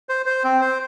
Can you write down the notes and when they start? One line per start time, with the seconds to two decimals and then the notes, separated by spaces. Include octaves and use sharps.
0.09 C5
0.26 C5
0.44 C4
0.61 C5